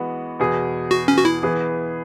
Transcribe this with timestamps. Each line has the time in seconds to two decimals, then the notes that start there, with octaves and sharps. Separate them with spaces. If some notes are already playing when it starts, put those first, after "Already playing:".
Already playing: E3 G#3 B3 F#4
0.39 E2 B2 B3 G#4
0.91 F#4
1.08 C#4
1.18 F#4
1.25 E4
1.43 E3 B3 G#4